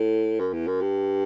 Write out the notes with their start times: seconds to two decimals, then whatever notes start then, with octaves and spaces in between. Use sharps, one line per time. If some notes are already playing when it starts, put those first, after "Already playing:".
Already playing: A2
0.39 F#2
0.53 E2
0.67 F#2
0.81 G2